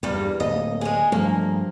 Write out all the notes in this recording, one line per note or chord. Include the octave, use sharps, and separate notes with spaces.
E2 G2 G3 A#3
D1 A#3 D#5
G#3 G#4
G2 F3 A3 A#3